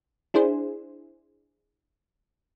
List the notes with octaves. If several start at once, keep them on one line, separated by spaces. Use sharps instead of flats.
D4 E4 G#4 C5